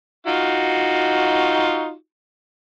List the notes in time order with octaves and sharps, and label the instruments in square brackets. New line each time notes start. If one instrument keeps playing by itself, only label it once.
[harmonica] D#4 F4 F#4